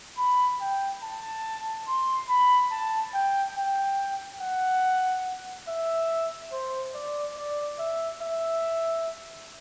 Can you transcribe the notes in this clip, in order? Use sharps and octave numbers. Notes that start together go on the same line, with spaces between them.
B5
G5
A5
C6
B5
A5
G5
G5
F#5
E5
C5
D5
D5
E5
E5